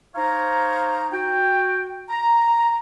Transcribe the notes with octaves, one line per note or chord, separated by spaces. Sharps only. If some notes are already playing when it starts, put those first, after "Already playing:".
D#4 C5 C#5 F5 A#5
F#4 G5
A#5